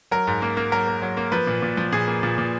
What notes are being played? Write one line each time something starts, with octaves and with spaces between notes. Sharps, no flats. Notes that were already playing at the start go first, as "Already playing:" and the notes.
F#3 A#4
G#2
A#3
A#3
F#3 A#4
A#3
F#3
A#3
F3 B4
A#2
A#2
F3
A#2 G#4
A#3
A#2
A#2